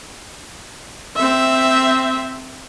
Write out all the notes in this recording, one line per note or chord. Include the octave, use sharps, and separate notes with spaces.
C4 E5